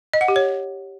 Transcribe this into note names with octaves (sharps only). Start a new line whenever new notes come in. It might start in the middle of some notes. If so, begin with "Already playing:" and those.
D#5
F#5
G4
C#5